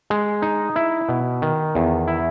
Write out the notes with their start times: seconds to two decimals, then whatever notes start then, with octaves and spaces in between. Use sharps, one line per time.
0.10 G#3
0.42 D#4
0.76 E4
1.09 B2
1.42 D#3
1.75 E2
2.08 E4